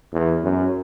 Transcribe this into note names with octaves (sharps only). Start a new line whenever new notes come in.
E2
F#2